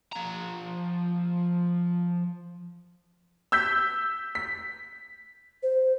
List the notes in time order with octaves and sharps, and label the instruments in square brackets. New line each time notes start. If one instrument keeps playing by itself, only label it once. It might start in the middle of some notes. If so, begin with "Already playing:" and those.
[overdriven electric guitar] F3 A#5
[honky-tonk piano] E6 G6 B6
B6
[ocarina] C5